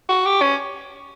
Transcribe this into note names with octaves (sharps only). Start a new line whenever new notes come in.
F#4
G4
C#4